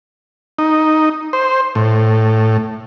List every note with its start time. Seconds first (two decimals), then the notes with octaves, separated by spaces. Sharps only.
0.59 D#4
1.33 C5
1.75 A2